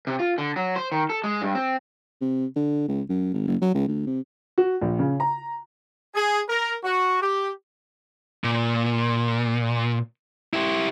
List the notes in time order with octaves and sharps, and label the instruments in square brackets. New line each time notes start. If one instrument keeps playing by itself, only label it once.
[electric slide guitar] C3
F4
D3
F#3
C5
D#3
A4
G#3
G2
C4
[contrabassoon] C3
D3
C#2
F#2
G#1
F#1
F#3
C#2
D2
C3
[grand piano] F#4
A#1
C#3
A#5
[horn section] G#4
A#4
F#4
G4
[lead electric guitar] A#2
E4 G4